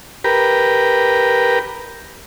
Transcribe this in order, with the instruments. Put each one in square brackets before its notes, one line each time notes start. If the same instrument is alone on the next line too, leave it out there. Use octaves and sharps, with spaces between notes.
[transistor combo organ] G4 A#4 B4